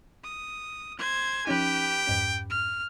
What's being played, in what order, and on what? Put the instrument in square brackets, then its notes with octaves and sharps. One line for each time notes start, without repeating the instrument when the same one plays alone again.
[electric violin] D#6
C5 G#6
[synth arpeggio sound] F3 C#4 D#4 [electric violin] G4 B4 [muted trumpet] G5
[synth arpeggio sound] F2 G#2 C#4
[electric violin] F6